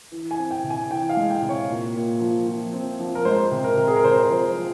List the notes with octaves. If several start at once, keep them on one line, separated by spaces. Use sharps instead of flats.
E3
G#5
C4
G5
C3
G#5
E3 G5
F5
G#3
G5
C3
C#5
A#2
A#2
F3
F3
C4
F3
A#4
G#3 C5
C3
A#4
C3
G#4
A#4
C3 C5
C5
F3
C5
F3